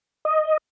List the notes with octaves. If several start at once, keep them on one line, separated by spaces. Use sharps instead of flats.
D#5